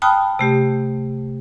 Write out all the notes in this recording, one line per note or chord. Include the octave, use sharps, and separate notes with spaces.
G5 A5 B5 D#6 F6 F#6
C3 A3 G4